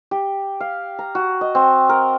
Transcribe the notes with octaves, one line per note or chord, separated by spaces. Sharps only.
G4
F5
A#5
F#4
D#5
C4
A#4